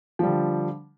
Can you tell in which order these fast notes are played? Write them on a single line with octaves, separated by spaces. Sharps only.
F3 G3 D3